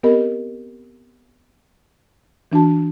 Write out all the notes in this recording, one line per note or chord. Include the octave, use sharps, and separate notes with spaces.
B3 C4 G4 A#4 D#5 B5
E3 D4 F#4 A5